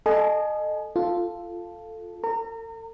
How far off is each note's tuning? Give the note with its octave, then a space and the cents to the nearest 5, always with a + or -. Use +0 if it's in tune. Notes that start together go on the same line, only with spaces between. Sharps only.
A4 +0 D#5 -20 G#5 +25
F4 +0 A4 +0
A4 +45 A#5 -30